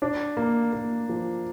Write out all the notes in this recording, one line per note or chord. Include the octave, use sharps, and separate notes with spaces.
D4
A#3
A#3
F3